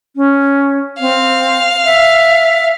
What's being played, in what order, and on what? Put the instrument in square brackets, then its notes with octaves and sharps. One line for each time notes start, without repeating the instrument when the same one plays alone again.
[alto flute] C#4
[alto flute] C4 [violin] F5
[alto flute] E5